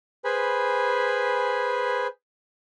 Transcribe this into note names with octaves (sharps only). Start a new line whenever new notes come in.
G#4 B4 C5 G#5 B5